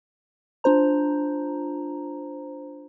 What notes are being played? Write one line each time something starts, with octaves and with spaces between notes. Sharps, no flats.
D4 F4 C5 A#5